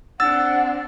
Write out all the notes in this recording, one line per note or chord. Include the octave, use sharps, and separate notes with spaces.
C4 D4 F#5 E6 A6